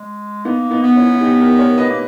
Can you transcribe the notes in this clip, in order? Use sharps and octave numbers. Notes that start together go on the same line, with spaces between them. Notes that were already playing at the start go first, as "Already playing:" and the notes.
Already playing: G#3
A#3 B3 D#4
B3 D#4
B3
C#4 E4
D#4
E4
D#4 G4
G4 A#4
A#4 C#5
B4 D#5
A#3